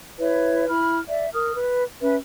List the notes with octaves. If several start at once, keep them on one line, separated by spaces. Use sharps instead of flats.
E4 B4 C#5 E5
E4 B5 F6
D5 E5
A#4 D#6 F6
B4
C#4 B4 E5